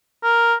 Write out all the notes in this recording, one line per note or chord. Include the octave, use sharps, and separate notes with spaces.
A#4